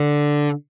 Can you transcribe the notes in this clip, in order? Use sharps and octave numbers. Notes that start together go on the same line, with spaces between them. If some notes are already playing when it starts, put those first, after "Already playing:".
Already playing: D3